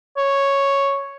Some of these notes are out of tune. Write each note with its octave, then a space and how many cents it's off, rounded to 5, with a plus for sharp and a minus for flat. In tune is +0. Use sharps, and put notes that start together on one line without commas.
C#5 +0